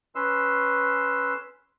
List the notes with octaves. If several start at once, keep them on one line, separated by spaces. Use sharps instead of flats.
C#4 B4 C6 E6